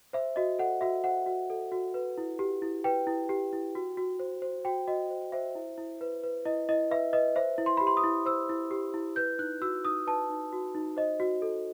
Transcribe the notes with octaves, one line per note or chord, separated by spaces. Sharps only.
C5 E5
F#4 D#5
A4 F#5
F#4 E5
C5 F#5
F#4
A4
F#4
B4
E4
G4
E4
B4 G5
E4
G4
E4
F#4
F#4
C5
C5
F#4 G5
F#4 D#5
C5
C5 E5
E4
E4
B4
B4
E4 D#5
E4 D#5
B4 E5
B4 D#5
C5 E5
E4
C6
G4 B5
C6
D#6
E4
C5 E6
E4
G4
E4
B4 G6
D#4 F#6
F#4 E6
D#4 D#6
B4 A5
D#4
F#4
D#4
C5 D#5
F#4
A4